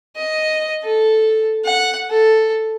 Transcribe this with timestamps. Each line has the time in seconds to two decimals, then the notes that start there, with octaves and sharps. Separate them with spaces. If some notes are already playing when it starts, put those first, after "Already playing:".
0.17 D#5
0.84 A4
1.65 F#5
2.10 A4